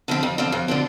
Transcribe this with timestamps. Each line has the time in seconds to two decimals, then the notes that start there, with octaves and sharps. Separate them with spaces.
0.08 D3 F3 C4
0.23 F2
0.38 D3 F3 C4
0.52 F2
0.68 D3 F3 C4